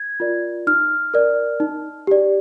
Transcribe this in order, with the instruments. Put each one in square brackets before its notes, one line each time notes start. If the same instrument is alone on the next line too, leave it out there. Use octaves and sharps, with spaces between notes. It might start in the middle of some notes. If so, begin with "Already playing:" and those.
Already playing: [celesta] G#6
F4 A#4 D5
D#4 F6
A#4 D5
D#4
G4 D5